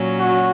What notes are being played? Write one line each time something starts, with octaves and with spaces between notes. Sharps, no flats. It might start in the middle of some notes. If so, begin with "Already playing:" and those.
Already playing: A#2 F#3 C#4
F#4